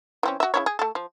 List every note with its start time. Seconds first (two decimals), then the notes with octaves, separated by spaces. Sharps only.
0.23 E3 C4 C#4
0.40 F#4 E5
0.54 C#3 E4 C#5
0.66 G#4
0.79 A3 A4
0.95 F3